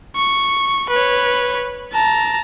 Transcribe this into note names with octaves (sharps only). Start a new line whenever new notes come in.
C#6
B4 C#5
A5 A#5